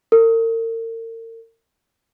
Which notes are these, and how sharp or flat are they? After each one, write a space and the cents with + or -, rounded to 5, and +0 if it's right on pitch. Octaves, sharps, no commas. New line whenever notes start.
A#4 -40